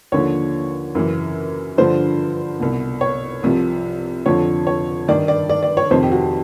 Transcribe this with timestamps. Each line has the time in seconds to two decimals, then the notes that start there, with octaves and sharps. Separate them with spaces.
0.12 D#2 D3 F3 C#5
0.95 F#2 C#3 E3
1.78 G2 D3 F3 C5
2.60 C2 B2
3.01 C#5
3.43 C2 C3 F3
4.26 F2 D3 F3 C#5
4.67 C#5
5.08 G2 D#3 D5
5.28 D5
5.50 D5
5.63 D5
5.77 C#5
5.91 F2 C3 D#3 C5
6.03 G4
6.12 F#4